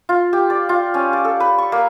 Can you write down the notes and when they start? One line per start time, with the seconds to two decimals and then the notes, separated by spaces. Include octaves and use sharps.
0.09 F4
0.33 G4
0.50 D5
0.69 F4
0.94 C#4
1.13 D5
1.25 A4
1.40 B4
1.58 C#6
1.72 A#3